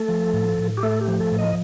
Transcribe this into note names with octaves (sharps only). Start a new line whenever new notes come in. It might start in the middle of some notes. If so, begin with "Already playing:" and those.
Already playing: A3 A4
F3
A2
A2
G4
A3 A4
G4
F3
A4
A2
D#5